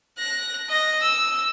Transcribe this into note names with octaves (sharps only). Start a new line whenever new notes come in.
F#6 A#6
D#5
E6